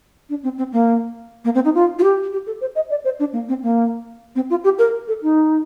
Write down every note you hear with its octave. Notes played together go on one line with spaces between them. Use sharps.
D4
C4
C4
A#3
A#3
C4
D#4
F4
F4
G4
G4
A4
C5
D#5
D5
C5
D4
A#3
C4
A#3
C4
F4
G4
A#4
A4
D#4